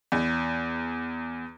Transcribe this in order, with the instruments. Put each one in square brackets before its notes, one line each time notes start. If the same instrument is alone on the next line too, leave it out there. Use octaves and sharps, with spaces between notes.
[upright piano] E2